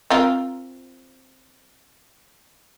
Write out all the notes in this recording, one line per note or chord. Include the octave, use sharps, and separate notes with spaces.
C4 F4 A#4